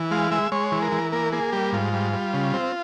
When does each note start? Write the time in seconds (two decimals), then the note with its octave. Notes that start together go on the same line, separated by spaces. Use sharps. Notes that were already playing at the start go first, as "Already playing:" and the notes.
Already playing: E3
0.11 G#3 F5
0.31 G#3 E5
0.52 G#3 C#5
0.72 E3
0.82 A#4
0.92 E3
1.12 A#3 A#4
1.32 A#3 G#4
1.52 G3 G4
1.72 G#2 F4
1.93 G3
2.13 G3
2.34 C#3
2.54 C4